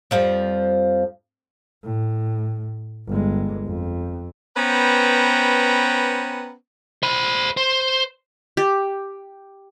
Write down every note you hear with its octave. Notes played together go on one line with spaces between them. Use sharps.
F2 F3 G3
A2
G1 G#3
F2
B3 C#4 B4 C5 G5 A#5
C5 B5
C5
G4